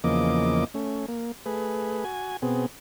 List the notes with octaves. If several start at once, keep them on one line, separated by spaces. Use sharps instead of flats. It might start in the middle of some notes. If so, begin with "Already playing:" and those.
E2 C#3 F3 A#3 D#5 D6
A3 C#4
A#3
A3 G#4 B4
F#4 G#5
B2 B3 C4 G#4